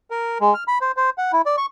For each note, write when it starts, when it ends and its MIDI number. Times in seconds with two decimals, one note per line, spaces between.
0.10 0.38 70
0.41 0.54 56
0.54 0.64 89
0.68 0.78 83
0.81 0.92 72
0.97 1.10 72
1.18 1.32 78
1.33 1.42 64
1.46 1.56 74
1.57 1.66 85